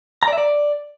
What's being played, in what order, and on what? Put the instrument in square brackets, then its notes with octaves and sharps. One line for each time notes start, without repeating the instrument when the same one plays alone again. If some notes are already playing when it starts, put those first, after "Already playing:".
[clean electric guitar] A#5
D5
E5
D5